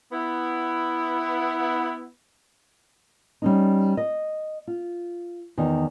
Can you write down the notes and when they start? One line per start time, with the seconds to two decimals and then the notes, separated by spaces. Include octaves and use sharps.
0.12 B3 E4
3.42 G3 C#4 D#4
3.97 D#5
4.67 F4
5.57 E2 D#3